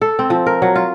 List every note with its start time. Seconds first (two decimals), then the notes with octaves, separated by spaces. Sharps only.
0.02 A4
0.19 C4
0.30 F3
0.46 A#4
0.62 F#3
0.76 F4